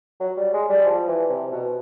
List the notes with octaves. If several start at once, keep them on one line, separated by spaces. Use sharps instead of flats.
F#3
G3
G#3
G3
F3
E3
C3
B2